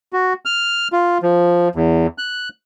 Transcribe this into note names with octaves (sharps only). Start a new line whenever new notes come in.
F#4
F6
F4
F3
E2
F#6